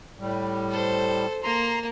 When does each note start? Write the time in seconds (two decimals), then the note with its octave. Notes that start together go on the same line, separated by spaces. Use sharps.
0.20 A2 G3
0.71 A4 C5
1.43 A#3 A#5 C6